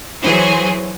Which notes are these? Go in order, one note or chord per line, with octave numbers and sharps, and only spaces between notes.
E3 F#3 G#4 C5